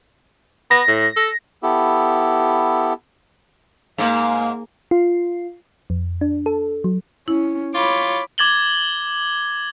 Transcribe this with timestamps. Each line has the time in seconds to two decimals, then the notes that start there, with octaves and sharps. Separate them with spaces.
0.71 B3 A#6
0.88 A2
1.17 A4
1.63 B3 E4 G4 A4
3.98 G#2 A#3 F5
4.91 F4
5.90 F2
6.21 D4
6.46 A4
6.84 F#3
7.28 C#4 E4
7.75 F4 C#5 B5 D6
8.38 D6 G#6 A6 F#7 G7